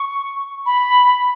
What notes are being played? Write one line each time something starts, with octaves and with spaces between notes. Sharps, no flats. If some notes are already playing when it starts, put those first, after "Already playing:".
Already playing: C#6
B5